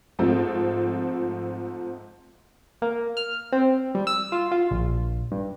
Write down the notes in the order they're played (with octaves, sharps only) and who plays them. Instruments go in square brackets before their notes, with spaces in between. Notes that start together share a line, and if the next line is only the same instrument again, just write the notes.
[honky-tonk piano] G#2 F3 A3 C4
[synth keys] A#3
F6
C4
G3
E6
F4
F4
A#1
G2